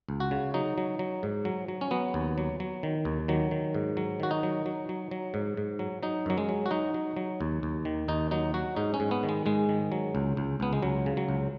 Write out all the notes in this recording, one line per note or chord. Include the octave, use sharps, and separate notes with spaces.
C#2
F#4
C#3
F#3 D#4
F#3
F#3
G#2
F#3
F#3
C#4
F#3 B3
D#2
F#3
F#3
D#3
D#2
D#3 F#3
D#3
G#2
F#3
D#3 F#4
D#4
F#3
F#3
F#3
F#3
G#2
G#2
F#3
F#3 D#4
F#2 F#3
G#3
F#3
F#4
F#3 D#4
F#3
F#3
D#2
D#2
D#3
D#2 D#4
F#3 D#4
F#3 F#4
G#2 D#4
C#4
G#2
B3
D#3
G#3
G#2 G#3
D#3
F#3
C#2
C#2
C#2 B3
G#3
C#2 F#3
C#3
F#3
C#2